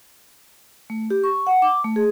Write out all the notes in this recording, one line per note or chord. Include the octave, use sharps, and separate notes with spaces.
A3
G4
C#6
F#5
D6
A3
G#4